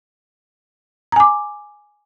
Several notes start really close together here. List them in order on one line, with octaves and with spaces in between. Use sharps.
A#5 G#5 D6